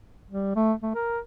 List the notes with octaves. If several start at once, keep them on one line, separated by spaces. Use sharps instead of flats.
G3
A3
A3
A#4